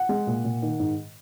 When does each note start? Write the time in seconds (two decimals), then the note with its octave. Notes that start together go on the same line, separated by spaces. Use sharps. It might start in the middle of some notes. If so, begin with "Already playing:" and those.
Already playing: F#5
0.09 G#3
0.27 A#2
0.44 A#2
0.62 D#3
0.79 G#2